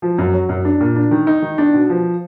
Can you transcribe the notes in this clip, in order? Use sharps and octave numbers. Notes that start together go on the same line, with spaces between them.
F3
F#2
F#3
F#2
D4
A#2
D4
D#3
D#4
D#3
D4
B2
F3